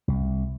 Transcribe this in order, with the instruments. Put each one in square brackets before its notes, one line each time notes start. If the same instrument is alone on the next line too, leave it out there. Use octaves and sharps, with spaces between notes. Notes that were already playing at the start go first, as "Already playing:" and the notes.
[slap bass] C2